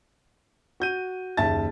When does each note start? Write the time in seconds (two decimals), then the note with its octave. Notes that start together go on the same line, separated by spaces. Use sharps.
0.80 F#4 G6 D#7
1.37 F#1 D#2 E5 A5 A6